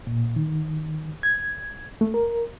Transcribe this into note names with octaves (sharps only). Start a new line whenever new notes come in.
A#2
D#3
G#6
A3
A#4